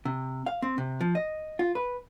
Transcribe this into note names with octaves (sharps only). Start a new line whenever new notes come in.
C3
F5
C4
C3
F3
D#5
F4
B4